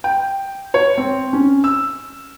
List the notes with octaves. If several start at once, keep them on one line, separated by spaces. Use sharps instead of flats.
G5
C#5
C4
C#4
E6